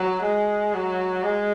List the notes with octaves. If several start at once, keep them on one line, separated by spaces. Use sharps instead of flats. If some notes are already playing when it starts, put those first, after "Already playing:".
Already playing: F#3
G#3
F#3
G#3